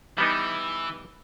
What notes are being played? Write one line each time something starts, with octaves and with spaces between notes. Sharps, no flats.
E3 G3 B3 D#4